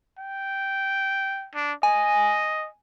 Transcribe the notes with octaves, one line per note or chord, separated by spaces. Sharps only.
G5
D4
D#5 G#5